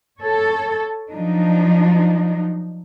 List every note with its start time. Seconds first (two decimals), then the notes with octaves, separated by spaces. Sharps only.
0.20 A4 C#5
1.13 F3 F#3 D4 D#4